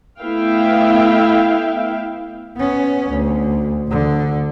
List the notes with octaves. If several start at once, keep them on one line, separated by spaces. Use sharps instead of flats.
A3 B3 E4 E5 F5 G5
B3 C#4
D2
D2 D3